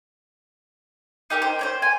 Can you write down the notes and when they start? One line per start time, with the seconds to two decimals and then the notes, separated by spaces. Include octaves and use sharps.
1.30 D#4 G4 A#4 G5
1.42 C5
1.59 C5 C#5 G5
1.82 G#5